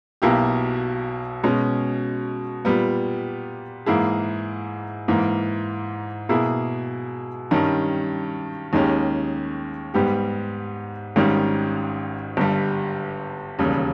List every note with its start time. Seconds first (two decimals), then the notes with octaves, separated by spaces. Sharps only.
0.22 B1 B2 A#3 E4 G4
1.44 B2 G#3 C#4
2.65 A#2 G3 B3
3.86 G#2 E3 A#3 E4 G#4
5.08 G#2 E3 A#3
6.29 B2 A#3 E4 G#4
7.51 G2 D#3 G3 C#4
8.73 D#2 D#3 G#3 C#4 G4
9.94 G#2 G3 B3 G4
11.16 G#1 G#2 D#3 G3 C#4
12.37 G1 G2 G3
13.59 E1 D#2 C#3 G3